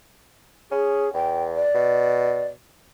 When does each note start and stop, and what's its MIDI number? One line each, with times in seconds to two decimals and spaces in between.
0.71 1.09 61
0.71 1.13 68
1.14 1.65 40
1.14 1.43 79
1.56 2.46 74
1.75 2.54 47